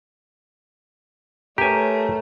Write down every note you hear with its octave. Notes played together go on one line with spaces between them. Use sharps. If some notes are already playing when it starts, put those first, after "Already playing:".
A3 G4 A#4 B4 C#5 G#5 A#5